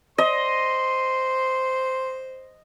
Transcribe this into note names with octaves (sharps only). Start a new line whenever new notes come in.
C5 D#5 C6